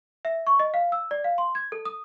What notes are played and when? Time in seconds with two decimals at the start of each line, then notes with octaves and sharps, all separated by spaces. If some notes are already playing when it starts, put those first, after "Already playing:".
0.25 E5
0.47 C#6
0.60 D#5
0.74 F5
0.92 E6
1.11 D5
1.24 F5
1.38 C6
1.55 G#6
1.72 A4
1.85 D#6